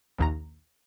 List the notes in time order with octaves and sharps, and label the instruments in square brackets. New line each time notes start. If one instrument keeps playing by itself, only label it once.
[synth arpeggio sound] A#1 D#2 A#5